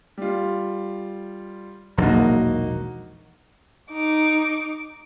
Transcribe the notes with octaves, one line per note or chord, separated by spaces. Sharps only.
G3 F4
E1 A#1 F#3 A#3 D#4 F#4
D#4 D6